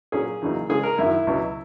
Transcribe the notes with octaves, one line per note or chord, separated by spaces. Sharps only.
A#2 F#3 C#4 G#4
E2 C#3 F#3 A#3 D#4
C#3 G#3 C#4 G#4
A#4
F#2 D#3 F#3 E4
C#2 B2 F#3 C#4